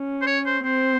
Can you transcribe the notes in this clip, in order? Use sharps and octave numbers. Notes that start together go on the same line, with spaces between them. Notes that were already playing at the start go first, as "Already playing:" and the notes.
Already playing: C#4
C5
C#5
C5
C4 C5